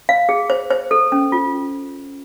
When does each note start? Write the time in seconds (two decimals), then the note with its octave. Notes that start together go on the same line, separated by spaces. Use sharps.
0.09 F5
0.29 G#4
0.50 C5
0.71 C5
0.91 A4
1.12 C#4
1.32 F4